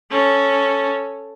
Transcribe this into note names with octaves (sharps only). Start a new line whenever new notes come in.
C#4 A4